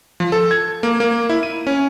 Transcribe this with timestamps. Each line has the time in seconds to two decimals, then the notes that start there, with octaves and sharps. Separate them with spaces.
0.20 F3
0.32 A4
0.51 G#6
0.83 A#3
1.00 A#3
1.29 E4
1.43 D#7
1.67 C#4